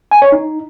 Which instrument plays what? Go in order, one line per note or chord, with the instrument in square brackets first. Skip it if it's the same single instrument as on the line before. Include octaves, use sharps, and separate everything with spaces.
[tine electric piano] G#5
C#5
D#4